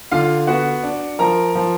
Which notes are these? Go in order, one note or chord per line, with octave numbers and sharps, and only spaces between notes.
D3 F4 F5
B3 F#4 F#5
D4
F3 A#4 A#5
F3